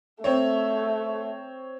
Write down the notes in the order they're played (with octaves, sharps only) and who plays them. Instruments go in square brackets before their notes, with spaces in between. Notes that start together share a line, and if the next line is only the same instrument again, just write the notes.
[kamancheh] A3 [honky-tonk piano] C4 C#5